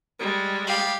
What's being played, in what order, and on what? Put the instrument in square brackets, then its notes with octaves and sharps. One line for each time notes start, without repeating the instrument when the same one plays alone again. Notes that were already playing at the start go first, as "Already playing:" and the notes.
[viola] G3 G#3
[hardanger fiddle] G4 F5